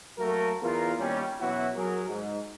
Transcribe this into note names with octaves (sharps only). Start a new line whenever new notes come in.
F#3 A3 A#3 F#4 A4 A#4
E2 F4 A#4
D#2 G3 C#4
B2 E3 F#3 C#4 E4 F#4
F#3 G#4 A#4
G#2